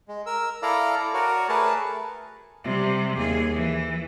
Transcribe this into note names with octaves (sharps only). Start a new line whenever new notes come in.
G#3
A#4 E6
E4 A4 D5 F5 A#5
F#4 A#4 C#5 D5
A3 G#4 A#4 B4 A5
C3 G3
D#2 G#4
E3